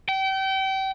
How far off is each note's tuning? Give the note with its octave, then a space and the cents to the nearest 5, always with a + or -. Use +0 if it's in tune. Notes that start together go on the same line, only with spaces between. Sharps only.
G5 -30